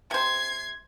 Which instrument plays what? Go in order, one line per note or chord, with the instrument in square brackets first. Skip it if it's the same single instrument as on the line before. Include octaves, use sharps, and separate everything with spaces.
[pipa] C3 C5 [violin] G#6 C7